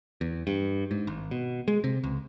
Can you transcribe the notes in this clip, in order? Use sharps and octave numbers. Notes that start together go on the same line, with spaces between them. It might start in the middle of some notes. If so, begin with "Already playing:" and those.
E2
G2
G#2
G#1
B2
G#3
C3
C#2